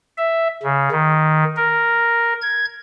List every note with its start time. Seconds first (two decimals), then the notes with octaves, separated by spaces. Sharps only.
0.18 E5
0.63 C#3
0.91 D#3
1.57 A#4
2.42 G#6